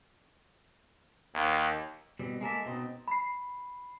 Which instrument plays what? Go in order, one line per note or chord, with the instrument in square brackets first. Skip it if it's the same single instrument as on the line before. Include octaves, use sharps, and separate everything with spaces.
[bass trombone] D#2
[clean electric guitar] B2 G3 C4
G#3 A#3 A4 E5
B2 C4 D#4
[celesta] B5 C7